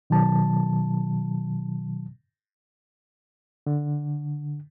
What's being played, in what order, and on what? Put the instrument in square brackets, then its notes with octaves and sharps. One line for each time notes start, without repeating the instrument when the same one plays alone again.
[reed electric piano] B2 D#3 F#3 A5
D3